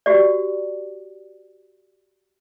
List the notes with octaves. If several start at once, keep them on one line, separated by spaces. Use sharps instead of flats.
F#4 G4 D5